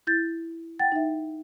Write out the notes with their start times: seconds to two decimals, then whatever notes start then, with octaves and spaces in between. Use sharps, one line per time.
0.07 E4 G6 A6
0.79 F#5 G5 A6
0.92 D#4 E5